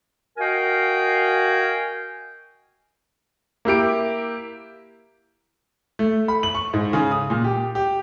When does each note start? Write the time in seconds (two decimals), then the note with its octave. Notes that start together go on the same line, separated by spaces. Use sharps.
0.38 F#4 A#4 D#5 F5 G5 G#5
3.65 A#3 E4 G4 D7
5.99 A3
6.28 B5
6.43 F#7
6.55 C#6
6.74 G#2
6.93 C#3
7.11 D#6
7.30 A#2
7.44 G4
7.75 G4